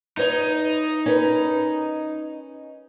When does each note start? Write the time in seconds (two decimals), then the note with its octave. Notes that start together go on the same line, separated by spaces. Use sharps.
0.17 D#4 E4 B4 C#5
1.06 C#4 A#4 B4